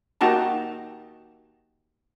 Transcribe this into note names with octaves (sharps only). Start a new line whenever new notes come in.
A#3 D#4 F#4 G4 A5 A#5